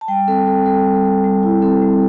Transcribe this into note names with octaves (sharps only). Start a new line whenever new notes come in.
A5
G3 G5
C4 A4
C4 A4
G3 A4
G3
G3
G3
E4
C4 A4
G3